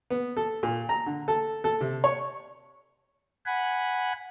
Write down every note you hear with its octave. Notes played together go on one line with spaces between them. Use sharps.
B3
A4
A#2
A#5
D3
A4
A4
C3
C#5
F#5 G#5 B5